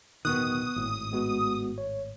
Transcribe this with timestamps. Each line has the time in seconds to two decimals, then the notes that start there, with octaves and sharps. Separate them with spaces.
0.25 D1 B2 D#3 B3 C#6 D#6 F#6
0.76 G#1 A2
1.12 G#3 B3 F#4
1.78 C#5